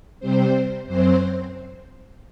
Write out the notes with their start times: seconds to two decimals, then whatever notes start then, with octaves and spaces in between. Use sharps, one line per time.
0.20 C3 G3 C4 C5
0.86 F#2 F#3 C4 C5